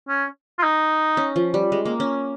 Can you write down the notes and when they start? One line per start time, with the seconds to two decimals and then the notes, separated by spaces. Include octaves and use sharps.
0.08 C#4
0.59 F4
0.63 D#4
1.17 C#4
1.36 F3
1.54 G3
1.72 G#3
1.85 A#3
2.00 C#4